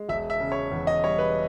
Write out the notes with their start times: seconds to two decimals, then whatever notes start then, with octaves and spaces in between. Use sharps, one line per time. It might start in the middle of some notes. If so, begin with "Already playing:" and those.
Already playing: G#3
0.09 E1 E5
0.30 E5
0.40 C#3
0.52 C#5
0.72 E2
0.87 D#5
1.04 G3 C#5
1.18 B4